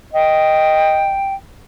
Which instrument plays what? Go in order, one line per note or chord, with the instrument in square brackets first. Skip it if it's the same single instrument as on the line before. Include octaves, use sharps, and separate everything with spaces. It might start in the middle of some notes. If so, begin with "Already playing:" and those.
[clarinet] D#5 [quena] G5